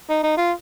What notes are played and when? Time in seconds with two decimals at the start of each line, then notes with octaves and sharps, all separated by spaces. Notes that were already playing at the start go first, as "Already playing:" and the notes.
0.10 D#4
0.24 D#4
0.37 F4